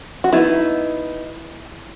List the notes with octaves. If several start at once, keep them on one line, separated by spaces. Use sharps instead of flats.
F#4
F#3 B3 D#4 E4